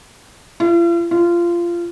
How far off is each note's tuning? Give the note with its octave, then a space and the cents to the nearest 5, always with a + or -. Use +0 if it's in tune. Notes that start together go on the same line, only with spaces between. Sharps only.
F4 -45
F4 -20